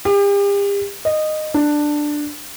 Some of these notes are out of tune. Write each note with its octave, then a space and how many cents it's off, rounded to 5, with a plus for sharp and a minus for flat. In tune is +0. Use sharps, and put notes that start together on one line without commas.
G4 +40
D#5 -15
D4 +10